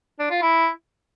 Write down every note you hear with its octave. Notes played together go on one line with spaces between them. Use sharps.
D4
F4
E4